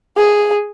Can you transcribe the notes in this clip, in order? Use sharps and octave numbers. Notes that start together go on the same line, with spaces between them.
G#4